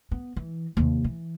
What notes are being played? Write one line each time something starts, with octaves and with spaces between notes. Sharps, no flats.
B3
E3
D#2 C3
E3